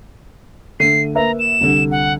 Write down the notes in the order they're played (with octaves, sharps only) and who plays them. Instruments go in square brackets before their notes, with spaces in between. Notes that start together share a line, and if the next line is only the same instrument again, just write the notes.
[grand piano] D3 A3 D#7 [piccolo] C7
[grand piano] A#3 B4 E5 [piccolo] A#5
[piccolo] E7
[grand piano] C2 D3
[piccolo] F#5